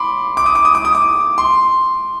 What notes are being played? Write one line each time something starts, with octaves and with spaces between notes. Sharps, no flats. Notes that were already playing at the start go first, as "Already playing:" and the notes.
Already playing: B5 C6 D6
D6
D#6
D6
D#6
D6
D#6
D6
C6